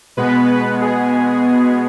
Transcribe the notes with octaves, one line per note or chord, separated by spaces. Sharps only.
B2 G#3 B3 B4
G#4